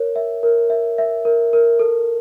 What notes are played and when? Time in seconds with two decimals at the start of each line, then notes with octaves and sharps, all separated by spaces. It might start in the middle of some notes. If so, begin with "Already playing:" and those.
Already playing: A#4 C#5
0.16 E5
0.43 A#4
0.70 E5
0.98 E5
1.25 A#4
1.53 A#4
1.79 A4